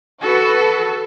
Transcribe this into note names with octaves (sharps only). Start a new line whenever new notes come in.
F#4 A4 B4